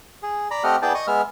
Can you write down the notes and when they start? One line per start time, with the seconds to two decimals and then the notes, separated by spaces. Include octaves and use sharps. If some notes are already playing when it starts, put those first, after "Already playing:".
0.23 G#4
0.51 D5 A#5 B5
0.64 A3 C4 G4 D#5 F#5 F6
0.82 B3 E4 G#4 D5 G5 A5
0.95 D#5 C#6 D#6
1.07 G#3 B3 E5 F6